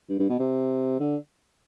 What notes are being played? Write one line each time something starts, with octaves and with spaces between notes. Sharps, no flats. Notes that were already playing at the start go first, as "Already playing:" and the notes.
G2
G2
B2
C3
D3